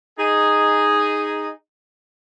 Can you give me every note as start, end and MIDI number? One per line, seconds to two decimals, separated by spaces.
0.18 1.50 63
0.18 1.50 68